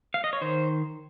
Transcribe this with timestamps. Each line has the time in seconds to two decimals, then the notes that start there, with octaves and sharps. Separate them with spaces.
0.14 F5
0.24 D#5
0.33 C#5
0.41 D#3 C5